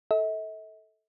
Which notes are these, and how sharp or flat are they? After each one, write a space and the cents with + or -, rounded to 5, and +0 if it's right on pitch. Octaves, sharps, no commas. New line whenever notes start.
A4 +0 E5 -45